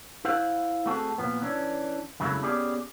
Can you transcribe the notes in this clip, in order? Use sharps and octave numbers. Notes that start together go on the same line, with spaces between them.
E4 C5 F5 F#5
A3 C4 F#4 G#4 A4
A#2 F3 B3
E3 C#4 D4
F2 C#3 F#3 G#3 A3 E4
B3 C#4 G4 G#4 D5